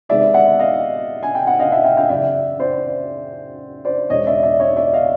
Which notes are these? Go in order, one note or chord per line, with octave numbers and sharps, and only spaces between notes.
C3 D#3 G#3 B3 D5 E5
E5 F#5
D#5 F5
G#5
G5
F#5
D#5 F5
E5 F#5
F5 G5
F5 G5
F#2 C#3 E3 D5 E5
C5 D5
C5 D5
E2 B2 G#3 C#5 D#5
D5 E5
D5 E5
C#5 D#5
D5 E5
D#5 F5